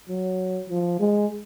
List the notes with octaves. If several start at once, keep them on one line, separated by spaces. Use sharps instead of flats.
F#3
F3
G#3